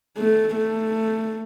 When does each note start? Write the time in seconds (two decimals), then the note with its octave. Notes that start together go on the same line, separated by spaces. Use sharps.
0.18 A3
0.55 A3